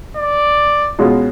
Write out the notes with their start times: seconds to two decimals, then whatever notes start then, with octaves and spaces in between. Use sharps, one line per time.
0.17 D5
0.99 B2 G#3 C#4 F4